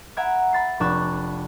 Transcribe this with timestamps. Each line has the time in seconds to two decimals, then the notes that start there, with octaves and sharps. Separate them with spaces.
0.17 E5 F#5 A#5 B5 G#6 D7
0.53 B5 A6 C7
0.80 F1 D4 A5 B5 C#6 F#6